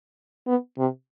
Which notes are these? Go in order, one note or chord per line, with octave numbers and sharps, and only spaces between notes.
B3
C3